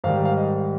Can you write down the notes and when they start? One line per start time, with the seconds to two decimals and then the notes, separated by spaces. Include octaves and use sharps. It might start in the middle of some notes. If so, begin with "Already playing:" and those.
0.04 G#2 D#3 G3 F5
0.25 F5
0.37 D#5